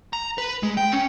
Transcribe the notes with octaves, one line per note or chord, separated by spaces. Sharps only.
A#5
B4
G#3
G5
C#4